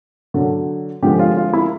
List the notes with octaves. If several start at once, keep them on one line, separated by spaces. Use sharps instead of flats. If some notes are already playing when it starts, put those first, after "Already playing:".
D3 F#3
D3 F3 G#3 G4
F4
F4
E4